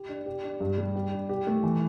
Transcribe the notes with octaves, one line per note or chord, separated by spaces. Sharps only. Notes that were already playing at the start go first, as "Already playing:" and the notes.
Already playing: G4
D4
G4
D4
G2
G3
G4
D4
G4
A3
E3